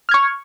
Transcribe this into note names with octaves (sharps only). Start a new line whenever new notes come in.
C#6 F6 G#6